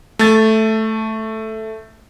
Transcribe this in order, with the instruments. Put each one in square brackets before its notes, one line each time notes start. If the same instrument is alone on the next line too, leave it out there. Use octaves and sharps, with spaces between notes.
[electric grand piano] A3 A6